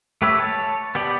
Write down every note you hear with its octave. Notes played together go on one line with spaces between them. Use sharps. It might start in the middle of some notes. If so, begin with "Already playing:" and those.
A3 G4 B4 C#5 E5
C#5 A5
B3 G4 D5